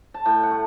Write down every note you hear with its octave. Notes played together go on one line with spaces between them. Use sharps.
A5
A2 G5
F#5
A3